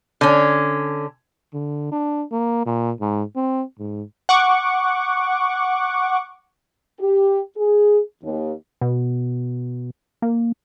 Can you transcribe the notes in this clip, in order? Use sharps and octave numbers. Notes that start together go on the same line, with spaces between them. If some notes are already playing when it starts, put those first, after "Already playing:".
D3 C#4
D3
D4
A#3
A#2
G#2
C4
G#2
F#5 C#6 D6
G4
G#4
D#2
B2
A#3